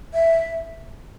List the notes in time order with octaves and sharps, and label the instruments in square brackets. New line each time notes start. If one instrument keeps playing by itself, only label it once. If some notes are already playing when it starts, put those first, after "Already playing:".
[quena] E5